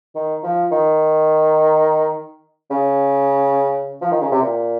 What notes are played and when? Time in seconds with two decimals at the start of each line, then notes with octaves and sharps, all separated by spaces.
0.15 D#3
0.43 F3
0.71 D#3
2.71 C#3
4.02 F3
4.11 D#3
4.21 C#3
4.31 C3
4.42 A#2